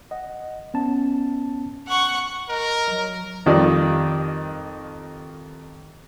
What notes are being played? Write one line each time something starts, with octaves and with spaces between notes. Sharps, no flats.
D#5 F#5
B3 C#4 A5
F#5 C#6
A#4 D#5
F#3
F2 D#3 F3 G3 D5